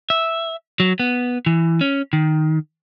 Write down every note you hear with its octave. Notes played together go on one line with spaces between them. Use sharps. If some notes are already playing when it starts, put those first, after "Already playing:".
E5
F#3
B3
E3
C#4
D#3